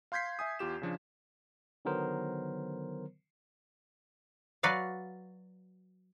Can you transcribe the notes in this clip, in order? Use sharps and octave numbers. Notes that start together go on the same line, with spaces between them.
F5 C6 G6 G#6 B6 C7
E5 G#5 D#6
E2 F4 G4 E7
C#3 F3 D4
D3 D#3 F#3 B3 A#4 C5
F#3 F#4 B4 D5 F5